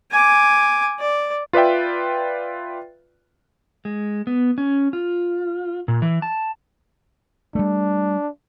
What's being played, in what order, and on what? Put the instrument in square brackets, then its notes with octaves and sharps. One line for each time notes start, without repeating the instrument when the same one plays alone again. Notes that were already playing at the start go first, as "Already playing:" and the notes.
[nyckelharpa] G#5 D6
D5
[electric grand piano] F4 B4 D5 E5 G5
[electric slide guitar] G#3
B3
C#4
F4
A#2
E3
A5
[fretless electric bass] G3 A3 [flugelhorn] D4